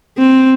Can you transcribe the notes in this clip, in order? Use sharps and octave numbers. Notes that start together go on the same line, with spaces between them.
C4